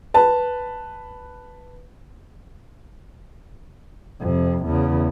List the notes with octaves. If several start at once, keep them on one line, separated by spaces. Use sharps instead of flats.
B4 A5
F2 C3
E2 C#3